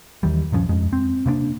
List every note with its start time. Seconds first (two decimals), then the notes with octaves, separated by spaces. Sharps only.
0.23 D#2 D#3 E3 G3
0.52 D#1 G2 F3 C#4
0.69 F2 G#3
0.93 C4
1.26 C3 A#3 B3 D4